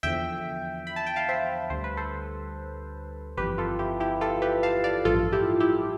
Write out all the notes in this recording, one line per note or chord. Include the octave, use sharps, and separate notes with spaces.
E2 D3 F3 E5 G5
B5
A5
G5
F5 A5
C5 E5
D2 D3 G3 C5
B4
A4 C5
G1 F2 E3 G4 B4
F4 A4
E4 G4
E4 G4
F4 A4
G4 B4
F5 A5
D5 F5
A1 G2 F3 F4 A4
E4 G4
E4 G4